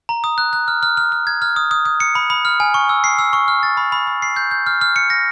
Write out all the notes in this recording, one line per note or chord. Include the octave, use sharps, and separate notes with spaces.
A#5
D#6
F#6
F#6
F6
F6
F6
F6
G#6
F6
D#6
D#6
D#6
C#7
B5
B5
F6
G#5
C#6
E6
C7
E6
C#6
F6
A6
B5
B5
B5
C7
G6
G6
F6
F6
C#7
A#6